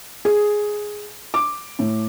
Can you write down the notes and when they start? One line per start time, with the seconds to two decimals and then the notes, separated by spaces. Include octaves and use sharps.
0.25 G#4
1.34 D6
1.79 A2